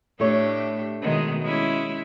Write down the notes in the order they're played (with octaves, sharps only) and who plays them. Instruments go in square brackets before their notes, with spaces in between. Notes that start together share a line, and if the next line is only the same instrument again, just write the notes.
[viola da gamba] A2 D4 G4 [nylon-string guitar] A3 C#5
[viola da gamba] B2 D#3 G#3
G#3 C#4 E4